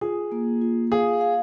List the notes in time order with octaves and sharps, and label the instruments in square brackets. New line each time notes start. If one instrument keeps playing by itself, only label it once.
[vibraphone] F4 [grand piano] G#4
[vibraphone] A#3
F4
[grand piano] G#4 [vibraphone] F5
[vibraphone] F5